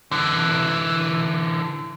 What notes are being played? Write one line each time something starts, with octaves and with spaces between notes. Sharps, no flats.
D3 E3